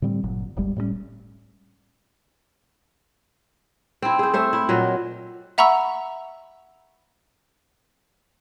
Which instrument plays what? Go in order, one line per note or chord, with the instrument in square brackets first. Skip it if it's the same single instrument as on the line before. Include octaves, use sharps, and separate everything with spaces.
[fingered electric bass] A2 D3 G3 C4
G1 A#2 F#3
D1 G1 G3 G#3
A2 G3 G#3 C#4
[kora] C4 E4
G#4 C5
A3 C5 E5
E4
A#2 F#3 D#5
[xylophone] E5 F#5 A#5 B5 C#6 E6